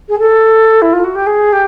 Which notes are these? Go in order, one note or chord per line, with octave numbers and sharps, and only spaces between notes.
G#4
A4
E4
F4
F#4
G4
G#4
G4